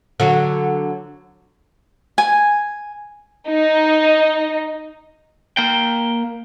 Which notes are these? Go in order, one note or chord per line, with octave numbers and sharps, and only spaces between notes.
D3 F#3
G#5
D#4
A#3 G5